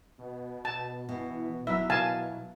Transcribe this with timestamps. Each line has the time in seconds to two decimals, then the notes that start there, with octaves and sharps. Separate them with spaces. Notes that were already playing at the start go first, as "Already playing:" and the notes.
0.18 B2
0.65 A5
1.09 B2 E3
1.67 D#1 F#3 E4 E5
1.90 B2 F5 G#5 A5